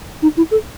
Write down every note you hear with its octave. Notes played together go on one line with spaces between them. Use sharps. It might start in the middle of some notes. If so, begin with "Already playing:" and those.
D#4
E4
A4